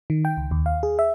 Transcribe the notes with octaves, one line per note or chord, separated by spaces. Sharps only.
D#3
G5
C#2
D#2
F5
G#4
E5